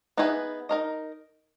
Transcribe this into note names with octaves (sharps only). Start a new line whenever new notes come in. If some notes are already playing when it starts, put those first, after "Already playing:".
B3 D#4 G#4 B4 E5
D#4 A#4 D#5